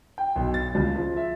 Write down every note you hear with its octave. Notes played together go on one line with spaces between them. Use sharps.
G5
B1
A6
C#2
F3
E5